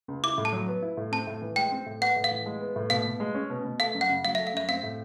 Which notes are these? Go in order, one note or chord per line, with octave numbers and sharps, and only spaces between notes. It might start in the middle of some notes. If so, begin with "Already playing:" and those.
C#2
E4 D6
A2
A5
F#3
B3
E4
A2
C4 A5
A2
E3
G#3 G5
C4
A2
B3 F#5
A2
F5
E3
G#3
B3
A2
B2 F5
B2
G#3
C#4
B2
B2
A3 F5
F#2
F#5
C#3
F#3 F5
A3 E5
F5
F#2 E5
C4 F5
A2